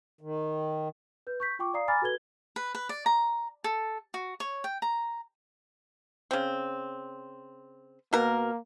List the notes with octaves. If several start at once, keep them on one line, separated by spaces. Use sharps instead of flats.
D#3
B4 G6
C#6 G6 B6
F4 G5 C#6 D6
D5 F5 A#5 D#6 C7
G#5 A#5 B5 D6 F6 A6
F#4 A4 B4 G#6 G7
B4
B4
D5
A#5
A4
F#4
C#5
G5
A#5
C#3 C4
B2 A#3 A#4